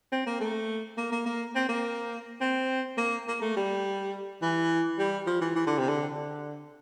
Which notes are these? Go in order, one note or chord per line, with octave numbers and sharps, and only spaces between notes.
C4
A#3
A3
A#3
A#3
A#3
C4
A#3
C4
A#3
A#3
A3
G3
E3
G3
F3
E3
E3
D3
C3
D3
D3